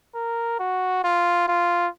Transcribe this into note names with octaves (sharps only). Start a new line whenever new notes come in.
A#4
F#4
F4
F4